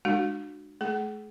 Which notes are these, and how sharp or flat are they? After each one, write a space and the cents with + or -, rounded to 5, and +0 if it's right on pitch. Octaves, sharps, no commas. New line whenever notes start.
G#3 +0 D4 +30 F#4 -5
A3 -45 G#4 +30